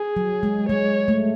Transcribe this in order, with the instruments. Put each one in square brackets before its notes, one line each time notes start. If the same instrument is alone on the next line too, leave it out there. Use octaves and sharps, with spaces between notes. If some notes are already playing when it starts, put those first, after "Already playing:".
Already playing: [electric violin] G#4
[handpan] F#3
G#3
[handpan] G#3 [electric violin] C#5
[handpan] A3